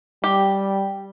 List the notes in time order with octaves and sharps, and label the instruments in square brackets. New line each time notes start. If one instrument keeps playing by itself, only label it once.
[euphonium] G3 [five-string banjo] G4